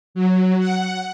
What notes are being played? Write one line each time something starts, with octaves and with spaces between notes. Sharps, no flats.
F#3
F#5